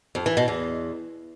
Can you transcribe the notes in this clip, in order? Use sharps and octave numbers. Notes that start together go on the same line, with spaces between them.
F2
E3
B2
E2